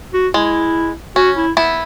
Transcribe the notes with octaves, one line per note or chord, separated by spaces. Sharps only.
F#4
G#3 E4
C#4 F#4
E4
B3 E4